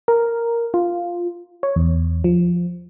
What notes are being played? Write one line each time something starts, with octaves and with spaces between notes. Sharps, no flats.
A#4
F4
C#5
E2
F3